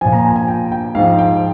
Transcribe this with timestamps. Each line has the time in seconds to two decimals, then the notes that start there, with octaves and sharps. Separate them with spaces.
0.01 A#2 F3 G#5
0.13 A#5
0.25 G#5
0.36 G#5
0.48 G5
0.72 G5
0.95 G#2 F3 F5
1.18 G5